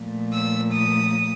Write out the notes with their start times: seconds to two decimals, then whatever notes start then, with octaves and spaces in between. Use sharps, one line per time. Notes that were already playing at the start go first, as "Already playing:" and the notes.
Already playing: A#2 F3 A3
0.32 E6
0.72 D#6